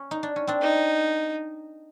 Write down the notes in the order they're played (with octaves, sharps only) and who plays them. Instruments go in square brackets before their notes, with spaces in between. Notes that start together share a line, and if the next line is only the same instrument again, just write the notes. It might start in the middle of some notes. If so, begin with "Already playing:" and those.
Already playing: [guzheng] C#4
D#4
D4
C#4
C4 D4
[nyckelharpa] D#4